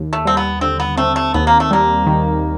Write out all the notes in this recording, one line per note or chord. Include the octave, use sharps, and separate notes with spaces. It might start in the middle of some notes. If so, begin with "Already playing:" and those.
Already playing: D#2
A3
G3 C4
B3
D3 C4
B3
A3 C4
A3
D#2 B3
A#3
A3
G3 A#3
D#3